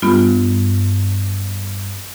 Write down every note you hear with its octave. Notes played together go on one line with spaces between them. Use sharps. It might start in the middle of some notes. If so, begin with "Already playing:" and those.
G2 B3 F4